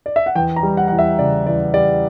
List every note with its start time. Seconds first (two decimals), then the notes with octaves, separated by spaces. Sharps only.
0.06 D5
0.16 E5
0.26 F#5
0.36 E2 G5
0.56 A#5
0.63 G3
0.77 F#5
0.88 E2 F#5
0.99 E5
1.19 C#3 D5
1.46 E2 D5
1.74 G3 D5